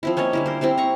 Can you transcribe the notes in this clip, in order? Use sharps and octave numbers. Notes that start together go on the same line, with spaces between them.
F3 C4 E4
A#3 C#4 C#5 D#5
D3 G3 E4
A#4 C5
C4 E4 G4 C5
A#5 C#6